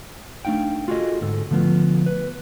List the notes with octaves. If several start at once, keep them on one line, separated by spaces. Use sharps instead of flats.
A3 D4 D#4 F5 G5
F4 F#4 G#4 A4 D#5
D2 G#2 A4
D3 F3 A3 B3 F4
B4